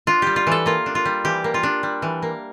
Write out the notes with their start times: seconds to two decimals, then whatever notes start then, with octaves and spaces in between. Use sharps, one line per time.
0.07 D4 F4
0.22 G3 G4
0.36 F4
0.47 E3 A4
0.66 A#3 F4
0.86 D4
0.95 F4
1.05 G3
1.25 E3 G4
1.44 A#3
1.54 F4
1.63 D4
1.83 G3
2.02 E3
2.22 A#3